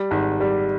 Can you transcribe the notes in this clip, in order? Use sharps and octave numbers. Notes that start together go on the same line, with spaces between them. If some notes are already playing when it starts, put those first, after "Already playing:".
Already playing: G3
G#1
G3